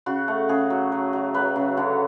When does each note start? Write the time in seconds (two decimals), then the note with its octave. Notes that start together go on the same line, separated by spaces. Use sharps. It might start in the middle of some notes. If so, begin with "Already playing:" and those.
0.06 C#3 F#4
0.28 A3
0.49 C#3 G#4
0.70 F#3
0.92 F#3
1.13 F#3
1.34 F#3 B4
1.56 C#3
1.77 D3 C#5